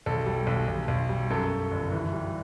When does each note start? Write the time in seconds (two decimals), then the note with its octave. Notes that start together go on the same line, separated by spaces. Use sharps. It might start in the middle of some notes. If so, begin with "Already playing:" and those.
0.06 B1 A4
0.26 G3
0.47 B1
0.68 B1
0.88 B1
1.09 G3
1.30 F#2 A4
1.51 F#2
1.71 G1
1.92 E3
2.13 G3